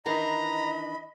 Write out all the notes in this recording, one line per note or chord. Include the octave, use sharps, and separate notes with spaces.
D#3 E3 D4 D#5 A#5 B5